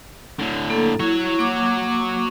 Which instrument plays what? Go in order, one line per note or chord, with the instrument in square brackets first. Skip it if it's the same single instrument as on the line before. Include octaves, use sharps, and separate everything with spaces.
[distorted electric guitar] A2 D3
[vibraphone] A#3 A4
[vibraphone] E4 [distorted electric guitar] F#4 C#5
[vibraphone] A#3 D6